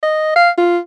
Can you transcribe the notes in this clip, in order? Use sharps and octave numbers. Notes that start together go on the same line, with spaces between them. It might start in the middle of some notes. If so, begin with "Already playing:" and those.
D#5
F5
F4